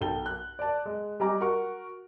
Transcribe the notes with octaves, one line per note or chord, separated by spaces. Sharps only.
B1 A4 G5 A5 G7
F#6
D5 A5
G#3
G3 G4 D#5 G#5 A#5 D6
F#4 A#4 F#5 C#6